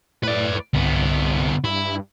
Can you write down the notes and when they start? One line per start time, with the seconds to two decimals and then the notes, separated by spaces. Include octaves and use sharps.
0.23 A2 B4 D5
0.74 C2 D3 B3
1.64 G2 E4